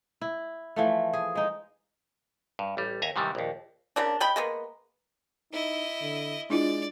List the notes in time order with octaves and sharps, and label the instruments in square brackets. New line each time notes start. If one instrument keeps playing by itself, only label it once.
[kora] E4
E3 F3 A3
G#4
G#3 D#4
[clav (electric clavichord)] G2
A1 G3
D#2 E5 G#5 A#5
G#2 C3 D#3 E3 G3
A#1 D#2
[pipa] C#3 A#3 D4
G#3 G5 B5
G#3 A#3 B3
[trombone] D#4 [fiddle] E4 D#5
[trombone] D3
[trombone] G#3 [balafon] D4 E4 F4 [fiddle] D5